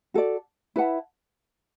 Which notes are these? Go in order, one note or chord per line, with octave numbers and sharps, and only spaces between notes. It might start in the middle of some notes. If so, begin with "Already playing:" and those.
F#4 A4 D5
E4 B4 F#5 A5